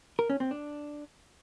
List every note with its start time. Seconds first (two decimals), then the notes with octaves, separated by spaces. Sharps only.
0.19 A#4
0.30 C#4
0.40 C4
0.51 D4